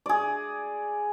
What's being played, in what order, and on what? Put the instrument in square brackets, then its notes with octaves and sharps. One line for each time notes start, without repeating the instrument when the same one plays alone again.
[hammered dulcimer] G#4 D5